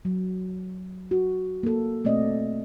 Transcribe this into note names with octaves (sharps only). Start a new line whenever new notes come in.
F#3
F#4
A#3 A4
B2 A3 C4 D5 D#5